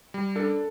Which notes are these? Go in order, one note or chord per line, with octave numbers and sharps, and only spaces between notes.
G3
D4 A4